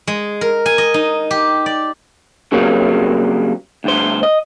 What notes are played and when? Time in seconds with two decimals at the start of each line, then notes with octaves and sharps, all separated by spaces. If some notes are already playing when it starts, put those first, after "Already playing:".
0.07 G#3
0.41 A#4
0.66 G#5
0.78 D#5
0.94 D#4
1.31 G4
1.66 D5
2.52 C#3 F#3 G3 A#3 C4
3.84 D2 G2 C5
4.23 D#5